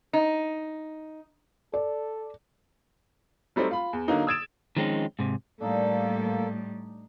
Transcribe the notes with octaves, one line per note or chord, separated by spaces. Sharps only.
D#4
A4 D5
F#3 G3 A3 C4 D#4
F4 B5
E2
D3 F#3 A#3 D#4
D#6 E6 G#6 A6 D7 E7
D#3 F3 G#3 C4 C#4 D#4
G#2 C3
A2 G3 A#3 D4 D#4 A4